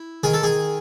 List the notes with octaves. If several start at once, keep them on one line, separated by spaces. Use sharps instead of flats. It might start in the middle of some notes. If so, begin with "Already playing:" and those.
Already playing: E4
D#3 G#4
A4
G#4